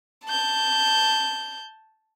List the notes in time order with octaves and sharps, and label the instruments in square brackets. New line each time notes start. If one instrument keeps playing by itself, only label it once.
[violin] A5 G6